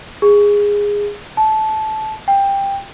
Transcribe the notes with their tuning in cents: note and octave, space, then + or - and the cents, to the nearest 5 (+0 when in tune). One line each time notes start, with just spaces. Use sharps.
G#4 -15
A5 -20
G5 +15